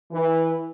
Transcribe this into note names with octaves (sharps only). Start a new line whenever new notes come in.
E3